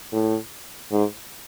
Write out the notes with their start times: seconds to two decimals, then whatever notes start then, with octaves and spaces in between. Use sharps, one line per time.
0.12 A2
0.92 G#2